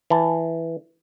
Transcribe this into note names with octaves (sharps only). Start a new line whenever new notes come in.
E3 A5